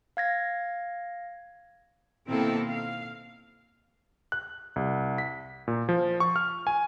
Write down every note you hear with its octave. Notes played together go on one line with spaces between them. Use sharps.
F5 G#6 A#6
B2 D#3 A#3 C4 E4 A4
F5
F#6
C2
B6
A#2
F3
C#6
F6
G#5